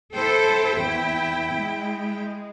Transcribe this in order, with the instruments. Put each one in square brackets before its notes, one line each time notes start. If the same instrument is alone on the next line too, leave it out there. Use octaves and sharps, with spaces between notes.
[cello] E4 G5 [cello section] A4 C5
[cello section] E2
G#3